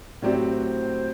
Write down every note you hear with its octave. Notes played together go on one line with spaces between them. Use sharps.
A2 F#3 C4 G4 D5
C5
C5
B4
C5